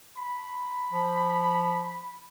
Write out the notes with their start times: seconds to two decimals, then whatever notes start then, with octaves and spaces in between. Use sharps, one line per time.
0.17 B5
0.92 F3